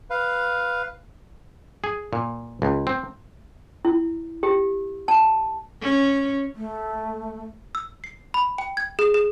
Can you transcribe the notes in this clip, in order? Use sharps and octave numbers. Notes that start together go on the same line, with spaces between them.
B4 F5
G#4
A#2
C#2
C4
E4
G4
A5
C#4
A3
E6
C7
B5
G5
G#6
G#4
G#4